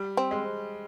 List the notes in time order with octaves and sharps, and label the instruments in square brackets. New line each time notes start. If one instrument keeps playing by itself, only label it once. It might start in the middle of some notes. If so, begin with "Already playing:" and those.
Already playing: [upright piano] G3
[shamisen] C4
[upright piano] G#3